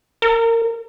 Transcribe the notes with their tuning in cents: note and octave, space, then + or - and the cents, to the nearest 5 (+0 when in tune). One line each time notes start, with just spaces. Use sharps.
A#4 -20